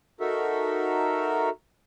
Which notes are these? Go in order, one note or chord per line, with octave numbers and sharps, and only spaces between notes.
D#4 F#4 A4 A#4 E5